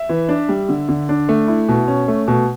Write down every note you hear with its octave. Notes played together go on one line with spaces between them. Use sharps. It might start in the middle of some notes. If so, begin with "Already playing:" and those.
Already playing: E5
E3
D4
G3
D3
D3
D4
A3
E4
B2
C#4
A3
B2